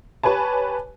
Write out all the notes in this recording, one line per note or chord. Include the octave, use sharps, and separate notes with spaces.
G4 B4 C#5 G#5 A5